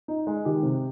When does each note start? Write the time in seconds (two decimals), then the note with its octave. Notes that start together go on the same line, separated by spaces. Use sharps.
0.08 D#4
0.27 G#3
0.45 D#3 G4
0.63 C3